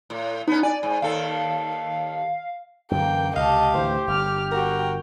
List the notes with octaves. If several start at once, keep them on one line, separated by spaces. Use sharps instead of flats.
A2
B3 C#4 D#4
D5 G#5
G#2
D#2 D#3 A4 F5
F#2 D3 E3 A#3 G5
C#2 C3 G4 D#5 F5 A5
D2 A2 E3 C5
G1 D6 F6
F#4 A#4 G5